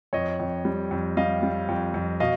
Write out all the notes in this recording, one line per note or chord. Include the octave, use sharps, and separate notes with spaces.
F2 C#5 D#5
F2
G3
F2
G3 D#5 F5
G3
F2
F2
B2 D#5 F5